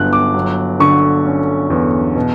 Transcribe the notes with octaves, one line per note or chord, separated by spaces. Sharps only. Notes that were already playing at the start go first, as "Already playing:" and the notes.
Already playing: G1 G2 F#3 B3 F#6
D6
F#3
D3 C#6
C#4
E2
B2